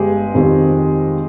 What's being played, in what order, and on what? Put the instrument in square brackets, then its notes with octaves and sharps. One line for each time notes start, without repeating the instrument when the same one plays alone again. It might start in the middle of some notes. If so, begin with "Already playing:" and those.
Already playing: [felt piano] G1 G2 G3 [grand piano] G#3 G4 G#4
[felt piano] F2 D#3 G3 C4